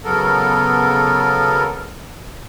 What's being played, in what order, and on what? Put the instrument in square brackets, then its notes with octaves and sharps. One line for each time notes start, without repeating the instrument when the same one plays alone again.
[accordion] C#3 F#3 B3 A4 A#4